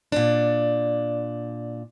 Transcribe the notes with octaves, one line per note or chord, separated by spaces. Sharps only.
A#2 D4